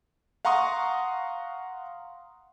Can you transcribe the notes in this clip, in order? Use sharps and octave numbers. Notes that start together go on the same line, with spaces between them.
F5 F#5 A#5 C6 C#6 D#6